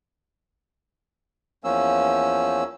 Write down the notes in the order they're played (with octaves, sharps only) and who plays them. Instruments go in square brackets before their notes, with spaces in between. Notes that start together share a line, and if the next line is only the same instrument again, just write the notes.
[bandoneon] E2 F3 A#3 C#4 E6